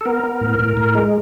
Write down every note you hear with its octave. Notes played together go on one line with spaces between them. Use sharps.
A4
B3 A#4
B3
A2
A2
A2
G#3